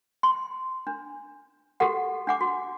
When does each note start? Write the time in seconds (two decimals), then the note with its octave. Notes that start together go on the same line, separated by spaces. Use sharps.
0.23 C6
0.87 D4
1.80 F#4 G4 A4 F#5
2.27 D4 F#5 D6
2.41 F#4